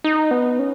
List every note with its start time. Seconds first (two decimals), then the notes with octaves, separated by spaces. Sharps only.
0.04 D#4
0.31 B3
0.59 C#4